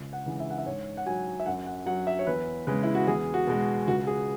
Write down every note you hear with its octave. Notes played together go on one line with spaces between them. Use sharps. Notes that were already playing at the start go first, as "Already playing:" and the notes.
Already playing: C#2
F#5
C#3 E3 G#3
E5
F#5
E5
G#2 C#5
F#5
F#3 G#5
E5
F#2 F#5
F#5
F#3 F#5
E5
C#5
E2 B4
C#3 G#3 B4
E4
F#4
E2 G#4
F#4
B2 G#3
C#2 F#4
G#4